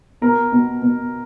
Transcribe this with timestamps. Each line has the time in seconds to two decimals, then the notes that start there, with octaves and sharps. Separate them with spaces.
0.22 B2 A#4
0.52 B2
0.82 B2